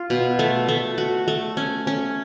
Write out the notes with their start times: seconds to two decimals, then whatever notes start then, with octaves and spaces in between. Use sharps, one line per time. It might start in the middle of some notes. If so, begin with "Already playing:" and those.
Already playing: F4
0.10 B2
0.39 A3
0.69 A3
0.98 F#4
1.28 A3
1.57 C#4
1.87 C#4